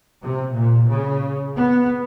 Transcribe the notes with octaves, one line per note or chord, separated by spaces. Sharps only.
C3
A#2
C#3
B3